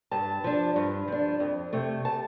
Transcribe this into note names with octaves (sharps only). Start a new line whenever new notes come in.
G2 A5
F3 D4
G2
F3 D4
F2
C3 A3
A5